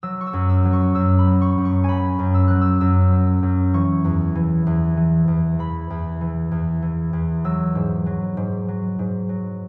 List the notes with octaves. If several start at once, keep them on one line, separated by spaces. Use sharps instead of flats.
F#3 E6
C#6
E6
F#2
E6
F#3
C#6
F#2 E6
B5
F#3
C#6
F#2
C#6
F#3 G#5 B5
F#2
E6
F#3 F#6
E6
F#2 E6
F#3
E6
F#2
E3 C#6
E2
E3
E2
E3
E2
E3 B5
E2
E3
E2
E3
E2
F#3 E6
G#2
F#3
G#2
F#3
G#2
F#3